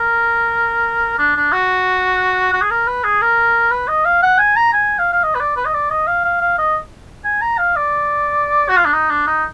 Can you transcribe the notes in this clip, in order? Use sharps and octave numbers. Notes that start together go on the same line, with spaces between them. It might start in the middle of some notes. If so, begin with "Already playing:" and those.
Already playing: A#4
D4
D4
F#4
F#4
G#4
A#4
B4
G#4
A#4
B4
D#5
F5
F#5
G#5
A#5
G#5
F5
F5
D#5
B4
D5
B4
D#5
D5
D#5
F5
F5
F5
D#5
G#5
A#5
F5
D5
F#4
F4
D4
D#4
D4
D#4